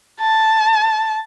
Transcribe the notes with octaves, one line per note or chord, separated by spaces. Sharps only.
A5